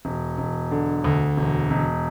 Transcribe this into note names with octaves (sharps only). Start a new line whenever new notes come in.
E1
E1
D3
D2
E1
E1